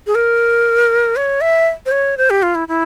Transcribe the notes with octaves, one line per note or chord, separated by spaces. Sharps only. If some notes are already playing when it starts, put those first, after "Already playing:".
G#4
A#4
C#5
E5
C5
C#5
C5
G4
F4
E4
E4